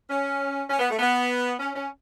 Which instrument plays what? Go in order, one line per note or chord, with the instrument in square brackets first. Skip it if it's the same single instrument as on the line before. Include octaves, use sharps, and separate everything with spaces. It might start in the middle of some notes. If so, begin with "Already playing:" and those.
[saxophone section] C#4
C#4
B3
A3
B3
C#4
C#4